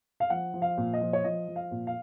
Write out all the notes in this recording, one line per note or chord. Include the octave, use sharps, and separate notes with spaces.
F5
F3 F#5
F3
F5
A#2
D#5
F3
C#5
F3 D#5
F3
F5
A#2
F5